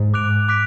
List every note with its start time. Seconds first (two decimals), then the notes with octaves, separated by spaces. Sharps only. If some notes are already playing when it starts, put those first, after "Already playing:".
Already playing: G#2
0.14 D6 F#6 D7 F7
0.48 D6 F#6 B6 D7